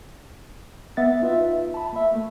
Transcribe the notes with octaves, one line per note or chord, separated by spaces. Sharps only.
B3 E5 F#5 A6
D#4 F4 B4 E5
A5 B5
A#3 E5
A3